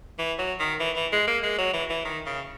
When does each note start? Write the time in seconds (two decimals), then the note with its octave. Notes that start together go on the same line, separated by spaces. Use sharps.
0.18 E3
0.39 F#3
0.60 D#3
0.80 E3
0.96 E3
1.12 G#3
1.27 A#3
1.43 G#3
1.58 F#3
1.73 E3
1.90 E3
2.05 D#3
2.26 C#3